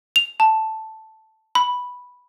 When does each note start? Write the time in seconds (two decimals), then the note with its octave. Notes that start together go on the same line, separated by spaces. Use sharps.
0.16 F7
0.40 A5
1.55 B5